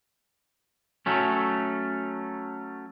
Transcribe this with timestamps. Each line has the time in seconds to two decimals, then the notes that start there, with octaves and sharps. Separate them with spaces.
1.06 F#3 A3 C#4